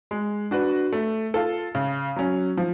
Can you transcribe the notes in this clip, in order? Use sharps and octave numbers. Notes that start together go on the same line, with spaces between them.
G#3
D4 F#4 B4
A3
F4 A4
C#3
F#3 C#4
F3